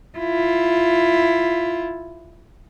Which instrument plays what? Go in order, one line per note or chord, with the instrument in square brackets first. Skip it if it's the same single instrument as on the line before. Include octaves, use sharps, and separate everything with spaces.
[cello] E4 F4